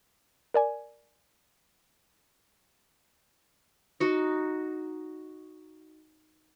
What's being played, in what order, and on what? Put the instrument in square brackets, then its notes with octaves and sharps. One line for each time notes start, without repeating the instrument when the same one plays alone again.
[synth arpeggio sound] A#4 D5 G#5
[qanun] D#4 F#4